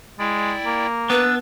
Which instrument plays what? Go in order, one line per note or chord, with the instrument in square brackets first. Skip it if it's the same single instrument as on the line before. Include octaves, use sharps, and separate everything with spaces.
[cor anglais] G#3 [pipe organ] E4 D5 G5
[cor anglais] A#3
[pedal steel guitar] B3 [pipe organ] D4 E6 A6 [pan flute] B4